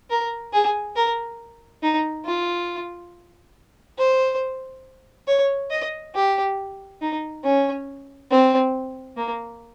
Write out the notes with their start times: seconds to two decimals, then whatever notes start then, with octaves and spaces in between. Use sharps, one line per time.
0.10 A#4
0.53 G#4
0.96 A#4
1.83 D#4
2.25 F4
3.98 C5
5.28 C#5
5.71 D#5
6.15 G4
7.01 D#4
7.44 C#4
8.30 C4
9.16 A#3